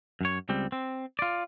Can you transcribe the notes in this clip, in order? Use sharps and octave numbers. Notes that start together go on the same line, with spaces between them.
F#2 C#5
C#2 G3 C4
C4
F4 D5